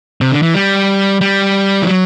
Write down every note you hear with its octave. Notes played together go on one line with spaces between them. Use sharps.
C3
D3
E3
G3
G3
E3
F#3